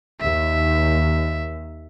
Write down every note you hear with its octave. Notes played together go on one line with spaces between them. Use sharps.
D#2 E5